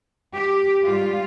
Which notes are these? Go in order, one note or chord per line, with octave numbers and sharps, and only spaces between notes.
G4
G#2 G3 F4